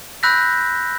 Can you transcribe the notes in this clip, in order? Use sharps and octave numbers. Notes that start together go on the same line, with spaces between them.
B5 E6 F#6 G6 A#6 B6